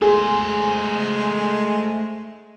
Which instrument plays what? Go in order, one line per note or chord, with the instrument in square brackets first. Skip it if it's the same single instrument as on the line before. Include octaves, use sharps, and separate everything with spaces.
[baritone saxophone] G#3 [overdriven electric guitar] A3 C5 [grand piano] G#4